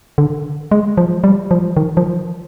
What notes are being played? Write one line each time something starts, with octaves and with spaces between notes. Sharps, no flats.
D3
G#3
F3
G3
F3
D#3
F3